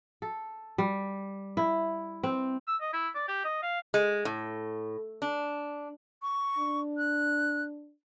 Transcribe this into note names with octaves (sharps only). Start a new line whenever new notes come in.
A4
G3
E4
C4
E6
D#5
E4
D5
G4
D#5
F5
G#3
A2
D4
C#6
D4
F#6